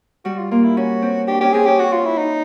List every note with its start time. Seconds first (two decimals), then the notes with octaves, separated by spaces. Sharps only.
0.25 G3 F#4
0.38 F4
0.51 A#3 F4
0.64 E4
0.77 C#4 F#4
1.02 C4
1.27 D4 G4
1.41 C#4 G4
1.53 C4 G#4
1.66 C#4 G4
1.79 F#4
1.92 F4
2.05 E4
2.18 D#4